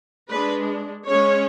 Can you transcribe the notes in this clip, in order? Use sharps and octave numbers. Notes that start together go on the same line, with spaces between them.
G#3 D4 B4
G#3 C#4 C#5